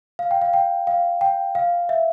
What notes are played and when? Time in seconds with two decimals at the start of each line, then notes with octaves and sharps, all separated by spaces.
0.19 F5
0.31 G5
0.42 F5
0.53 G5
0.87 F5
1.21 G5
1.55 F5
1.89 E5